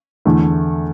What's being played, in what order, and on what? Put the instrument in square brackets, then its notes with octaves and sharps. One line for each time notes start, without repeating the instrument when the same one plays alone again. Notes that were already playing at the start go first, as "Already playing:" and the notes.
[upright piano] E2 D3 A3 E4